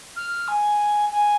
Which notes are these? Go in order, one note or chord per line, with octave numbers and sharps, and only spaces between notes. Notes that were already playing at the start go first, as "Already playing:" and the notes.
F6
G#5
G#5